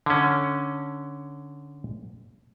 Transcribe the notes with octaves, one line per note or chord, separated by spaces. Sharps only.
D3 C#4